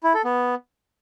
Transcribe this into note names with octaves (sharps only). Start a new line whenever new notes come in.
E4
A4
B3